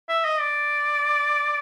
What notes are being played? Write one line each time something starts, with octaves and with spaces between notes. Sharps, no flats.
E5
D#5
D5